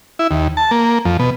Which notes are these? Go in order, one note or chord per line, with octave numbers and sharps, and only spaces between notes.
E4
D#2
A5
A#3
F2
B2